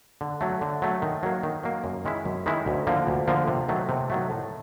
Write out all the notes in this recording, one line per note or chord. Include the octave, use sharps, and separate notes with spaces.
D3
F#3 A3
D3
F#3 A3
D#3
F#3 A#3
D#3
F#3 A#3
F#2
D#3 G#3 C#4 E4
F#2
D#3 G#3 C#4 E4
D2
D3 F3 A#3
D2
D3 F3 A#3
C3
D#3 F#3 A3
C3
D#3 F#3 A3
A2